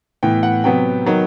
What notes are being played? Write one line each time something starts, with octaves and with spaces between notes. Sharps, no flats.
A2 E3 B3 G5
F#5
C3 F#3 B3 G5
D#3 F#3 B3 D#4